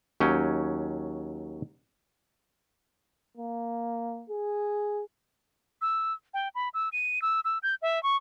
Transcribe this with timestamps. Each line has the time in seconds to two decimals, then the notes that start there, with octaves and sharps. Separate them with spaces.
0.20 D#2 F#3 C#4 G5
3.37 A#3
4.30 G#4
5.82 E6
6.34 G5
6.55 B5
6.74 E6
6.92 D#7
7.22 E6
7.45 E6
7.63 G6
7.82 E5
8.03 C#6